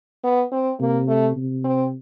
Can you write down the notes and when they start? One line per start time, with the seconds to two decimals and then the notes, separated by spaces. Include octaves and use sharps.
0.24 B3
0.52 C4
0.81 C3 A#3
1.08 A3
1.36 C3
1.65 C4